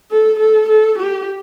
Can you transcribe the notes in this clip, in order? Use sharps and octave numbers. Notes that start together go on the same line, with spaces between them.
A4
A4
A4
G4